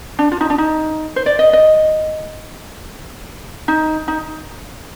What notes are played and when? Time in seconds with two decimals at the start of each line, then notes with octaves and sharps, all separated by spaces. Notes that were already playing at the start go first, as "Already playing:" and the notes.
0.19 D4
0.32 F4
0.41 D#4
0.50 D4
0.58 D#4
1.16 C5
1.26 D5
1.39 D#5
1.53 D#5
3.68 D#4
4.08 D#4